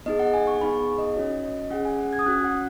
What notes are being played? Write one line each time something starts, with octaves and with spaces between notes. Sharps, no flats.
B3 D#4 G#4 D#5
F#5
G#5
C#6
B3 D#4 G#4 B5
D#5
C#4 F#4 C#5
D#5
C#4 G#4 F#5
G#5
F#5
G#6
D#6
C#4 F#4 F#6
F#5